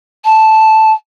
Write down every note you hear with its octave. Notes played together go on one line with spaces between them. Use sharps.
A5